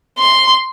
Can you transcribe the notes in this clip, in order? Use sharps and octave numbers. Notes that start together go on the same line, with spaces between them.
C6